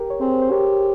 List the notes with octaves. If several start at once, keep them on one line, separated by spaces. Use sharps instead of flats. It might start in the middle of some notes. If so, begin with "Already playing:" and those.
Already playing: G4 A#4
C#5
C4 G#4 C5
C5
G4 A#4 C#5